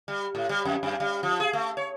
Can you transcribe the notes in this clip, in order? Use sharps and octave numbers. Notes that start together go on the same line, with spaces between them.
G3
A2
G3
F2
F#2
G3
F3
G#4
A3
C#5